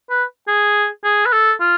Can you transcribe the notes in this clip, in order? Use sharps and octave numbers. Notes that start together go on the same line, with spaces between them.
B4
G#4
G#4
B4
A4
F4